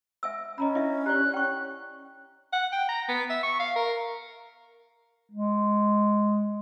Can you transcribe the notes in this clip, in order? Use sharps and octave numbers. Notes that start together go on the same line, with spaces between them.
E5 G#5 E6
C#4 D#5 A#5 B5
D4 E4 D#5 E5
G4 D5 A#5 F#6
G5 C#6
F#5
G5
A#5
B3
E5
C#6
F5
A#4
G#3